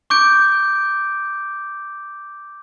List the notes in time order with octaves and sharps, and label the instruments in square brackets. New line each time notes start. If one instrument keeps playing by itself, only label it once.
[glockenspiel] C#6 D6 G6 D7